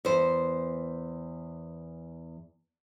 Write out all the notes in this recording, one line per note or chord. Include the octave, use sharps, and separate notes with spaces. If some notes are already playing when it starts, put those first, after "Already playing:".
E2 C5